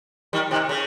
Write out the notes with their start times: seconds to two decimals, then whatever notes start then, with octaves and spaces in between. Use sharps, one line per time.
0.33 D#3 G3
0.51 C3 D#3
0.69 C#3